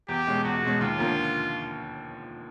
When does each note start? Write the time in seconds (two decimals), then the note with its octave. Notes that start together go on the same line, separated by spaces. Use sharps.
0.09 E2 G4
0.27 B2 G#3 C#4
0.44 E2 F#4
0.63 B2 G#3 C#4
0.81 D#2 F4
0.98 D3 F3 A#3 C#4